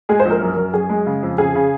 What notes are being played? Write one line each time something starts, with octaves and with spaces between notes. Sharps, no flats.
G#3 G#4
C5
A#1
A#4
F#2
F#2
F#2 G#4
G#3
C#3
F2
C#3 G#4
C#3